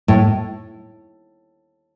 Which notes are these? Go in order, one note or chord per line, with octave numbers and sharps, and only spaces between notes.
A2